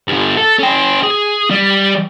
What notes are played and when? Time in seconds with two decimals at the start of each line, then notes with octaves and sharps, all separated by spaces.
0.08 G2 D3
0.37 A4
0.59 C#4 G5
1.03 G#4
1.51 G3